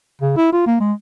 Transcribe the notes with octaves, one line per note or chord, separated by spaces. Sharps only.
C#3
E4
F4
A#3
G#3